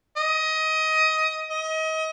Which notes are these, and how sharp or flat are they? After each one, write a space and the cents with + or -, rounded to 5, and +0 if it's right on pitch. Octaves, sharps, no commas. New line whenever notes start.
D#5 +20
D#5 +30